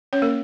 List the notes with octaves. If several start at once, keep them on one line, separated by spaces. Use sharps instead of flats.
C#4 C#5
A#3 A#4